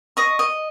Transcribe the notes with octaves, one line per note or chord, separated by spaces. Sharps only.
D#5 C#6
D#5